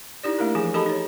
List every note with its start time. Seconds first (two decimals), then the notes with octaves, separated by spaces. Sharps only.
0.24 D#4 E4 G4 D5
0.38 A3 A#3 D4 E4 A#4
0.55 E3 F3 G#4 G#5
0.74 D#4 G4 A4 D#5 A5 B5
0.86 D#4 C#5